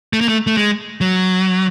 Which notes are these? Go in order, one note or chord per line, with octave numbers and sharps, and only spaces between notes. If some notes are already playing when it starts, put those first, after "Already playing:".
A3
A#3
A3
A3
G#3
F#3